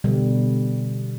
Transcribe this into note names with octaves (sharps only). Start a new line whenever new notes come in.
B2 D3 G3